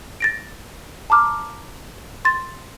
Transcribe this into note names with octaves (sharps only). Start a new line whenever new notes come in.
A6 A#6 D7
A5 A#5 D6 F6
C6 A6